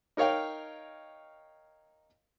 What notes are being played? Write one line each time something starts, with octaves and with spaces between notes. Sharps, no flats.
D#4 A#4 C#5 F5 G5